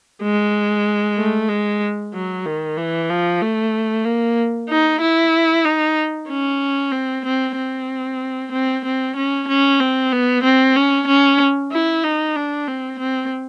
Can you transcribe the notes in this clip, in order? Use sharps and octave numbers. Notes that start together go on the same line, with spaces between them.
G#3
A3
G#3
F#3
D#3
E3
F3
A3
A#3
D#4
E4
D#4
C#4
C4
C4
C4
C4
C4
C#4
C#4
C4
B3
C4
C#4
C#4
E4
D#4
D4
C4
C4